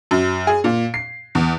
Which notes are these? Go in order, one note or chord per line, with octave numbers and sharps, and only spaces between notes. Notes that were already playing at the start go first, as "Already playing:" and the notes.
F#2
G#4
A#2
C7
E2